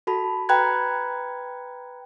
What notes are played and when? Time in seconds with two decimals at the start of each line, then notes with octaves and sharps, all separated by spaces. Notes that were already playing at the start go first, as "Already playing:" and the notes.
0.07 F#4 A4 A5 B5
0.49 B4 G5 A#5 B5 F#6 G#6